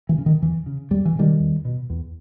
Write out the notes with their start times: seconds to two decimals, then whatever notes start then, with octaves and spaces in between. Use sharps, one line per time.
0.09 E3
0.18 C#3
0.26 D#3
0.42 E2 E3
0.66 C#3
0.91 E2 G3
1.05 E3
1.15 B2 D#3 G3
1.40 E2
1.65 B2
1.90 E2